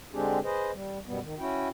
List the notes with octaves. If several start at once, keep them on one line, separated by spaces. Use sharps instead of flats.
D3 G#3 C4 D4 G4 G#4
G#4 B4 C5 D#5
G3
F#2 B2 G3 B3
D#3
C#4 E4 F#4 G5